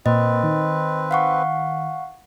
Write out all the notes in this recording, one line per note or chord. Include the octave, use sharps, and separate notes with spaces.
A#2 C4 B4 D#5
D#3
F5 F#5 C#6